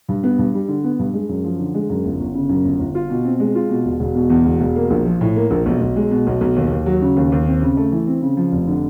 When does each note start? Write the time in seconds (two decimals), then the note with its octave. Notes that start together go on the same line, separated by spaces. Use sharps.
0.09 G2
0.23 B3
0.39 G2
0.54 G3
0.68 D3
0.84 B3
0.99 G2
1.14 G#3
1.29 F#2
1.44 F3
1.59 D3
1.74 G#3
1.89 F#2
2.05 G1
2.19 G1
2.34 C#3
2.49 F#2
2.65 G1
2.79 G1
2.95 F4
3.10 B2
3.25 C4
3.40 G#3
3.55 F4
3.70 B2
3.85 E1
4.00 E1
4.15 B2
4.30 E2
4.45 E1
4.60 E1
4.76 A#3
4.90 A#1
5.05 F3
5.21 A2
5.36 A#3
5.51 A#1
5.66 B1
5.81 B1
5.96 G#3
6.11 B2
6.27 B1
6.41 B1
6.56 D#2
6.71 D#2
6.86 F#3
7.02 C#3
7.17 D#2
7.32 D#2
7.47 C4
7.62 C#3
7.77 A3
7.92 E3
8.07 C4
8.22 C#3
8.37 F3
8.52 F1
8.67 D3